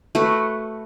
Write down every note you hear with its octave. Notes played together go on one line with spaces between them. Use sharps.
A3 F#4 B4